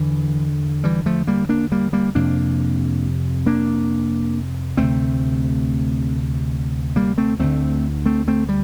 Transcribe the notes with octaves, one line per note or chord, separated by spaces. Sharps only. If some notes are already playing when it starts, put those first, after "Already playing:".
Already playing: E2 D3 E3
E3 G3
F3 A3
G3 A#3
A#3 D4
G3 A#3
G3 A#3
F2 C3 A#3 D4
A#3 D4
D2 C3 A3 C4
G3 A#3
A3 C4
D2 D3 A3 C4
A3 C4
A3 C4
G3